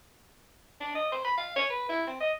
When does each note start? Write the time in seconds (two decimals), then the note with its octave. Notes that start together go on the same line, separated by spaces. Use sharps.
0.80 D4
0.95 D#5
1.12 C5
1.25 B5
1.38 F5
1.56 C#5
1.70 B4
1.89 E4
2.07 C4
2.20 D#5